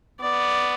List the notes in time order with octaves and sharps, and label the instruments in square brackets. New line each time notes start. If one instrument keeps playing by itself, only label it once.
[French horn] B3 [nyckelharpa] D5